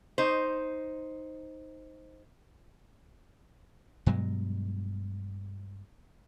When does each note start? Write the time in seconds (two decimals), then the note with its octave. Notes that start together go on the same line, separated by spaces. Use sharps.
0.18 D#4 C5
4.06 G2 B2 F#3 G#3